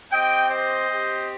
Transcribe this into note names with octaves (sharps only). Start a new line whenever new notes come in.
C4 G4 D#5 G5
C5 D#5
C4 G4